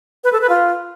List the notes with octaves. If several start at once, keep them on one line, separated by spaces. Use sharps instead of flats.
B4
A4
B4
F4